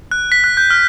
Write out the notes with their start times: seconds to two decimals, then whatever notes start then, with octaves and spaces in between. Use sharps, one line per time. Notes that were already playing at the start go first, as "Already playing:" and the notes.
0.11 F#6
0.32 B6
0.44 F#6
0.57 G6
0.70 F6